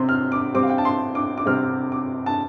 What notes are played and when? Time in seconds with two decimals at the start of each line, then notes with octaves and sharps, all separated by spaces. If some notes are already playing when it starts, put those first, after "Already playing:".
Already playing: C3 C4 C6
0.09 F6
0.32 D6
0.54 C3 G3 C4 D6
0.63 F5
0.70 G5
0.78 A5
0.85 C6
1.15 D6
1.38 D6
1.46 C3 G3 C4 F6
1.92 D6
2.26 A5